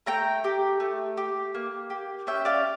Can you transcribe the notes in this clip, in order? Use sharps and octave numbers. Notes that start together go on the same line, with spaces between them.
A3 G5 A#5
G4
A3
G4
A#3
G4
C#4 E5 G5
D5 F5